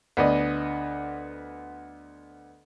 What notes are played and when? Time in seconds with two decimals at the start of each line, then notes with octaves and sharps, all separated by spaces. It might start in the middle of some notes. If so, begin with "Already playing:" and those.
0.17 D2 B3 D5 D#5